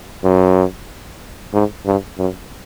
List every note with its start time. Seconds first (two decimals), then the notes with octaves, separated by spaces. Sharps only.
0.24 F#2
1.53 G#2
1.86 G2
2.18 F#2